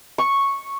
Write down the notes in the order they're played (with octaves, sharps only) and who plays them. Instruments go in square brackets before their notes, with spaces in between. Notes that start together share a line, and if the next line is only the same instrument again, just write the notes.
[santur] C#6